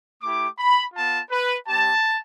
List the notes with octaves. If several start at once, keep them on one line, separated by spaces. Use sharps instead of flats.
A3 E4 G4 D6
B5
B3 F4 A5
B4
G3 C4 G4 A5